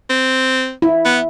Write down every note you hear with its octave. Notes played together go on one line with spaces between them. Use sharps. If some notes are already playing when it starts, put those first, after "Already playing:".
C4
E4
B3